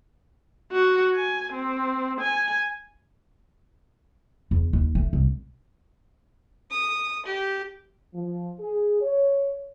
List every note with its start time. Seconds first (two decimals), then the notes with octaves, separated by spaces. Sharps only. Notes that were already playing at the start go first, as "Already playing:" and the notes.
0.72 F#4
1.15 G#5
1.53 C4
2.21 G#5
4.51 E2
4.73 D#2
4.95 A3
5.13 C2
6.71 D#6
7.26 G4
8.14 F3
8.60 G#4
9.02 C#5